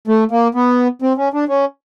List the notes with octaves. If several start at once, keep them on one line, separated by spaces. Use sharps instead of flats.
A3
A#3
B3
C4
C#4
D4
C#4